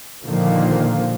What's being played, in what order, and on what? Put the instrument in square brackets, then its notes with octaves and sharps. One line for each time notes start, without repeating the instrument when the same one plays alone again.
[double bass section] A#2 D3 D#3 F3 A#3